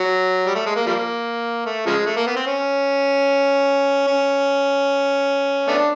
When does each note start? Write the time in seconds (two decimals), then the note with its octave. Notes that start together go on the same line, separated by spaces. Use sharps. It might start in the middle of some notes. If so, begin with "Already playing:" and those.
Already playing: F#3
0.46 G3
0.55 A3
0.66 G#3
0.76 A#3
0.86 F3 G3 A#3
1.66 A3
1.86 C#3 F3 G#3
2.06 A3
2.16 A#3
2.27 B3
2.36 C4
2.46 C#4
4.07 C#4
5.68 A3 B3 D4